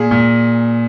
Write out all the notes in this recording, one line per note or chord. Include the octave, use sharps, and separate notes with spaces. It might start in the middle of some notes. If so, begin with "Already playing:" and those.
Already playing: A#2 G#4
A#2